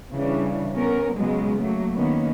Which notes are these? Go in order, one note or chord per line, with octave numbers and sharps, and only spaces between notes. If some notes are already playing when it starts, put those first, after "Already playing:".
C#3 E3 G3 D4
B3 C#4 A#4
C#3 F#3 G#3 B3
F#3 A3 A#3
D#3 A#3 B3 C#4